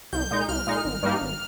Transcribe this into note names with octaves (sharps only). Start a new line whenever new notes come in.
C2 G6
A#2 G#3 D#4
C2 F6
A#2 G#3 D#4
G#1
G2 G3 A#3 D#4
G#1